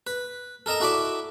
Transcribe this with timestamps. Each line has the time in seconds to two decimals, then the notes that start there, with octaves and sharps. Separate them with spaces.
0.07 B4
0.66 A4 A#4 D#5 A5 A#5
0.80 E4 F#4 A4 D5 B5 D6